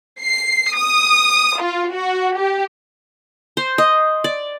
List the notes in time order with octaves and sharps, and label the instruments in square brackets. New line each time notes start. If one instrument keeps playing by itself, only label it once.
[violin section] C7
D#6
F4
F#4
G4
[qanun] C5
D#5
D5